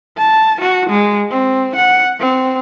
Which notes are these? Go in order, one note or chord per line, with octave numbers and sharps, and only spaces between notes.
A5
F#4
G#3
C4
F#5
C4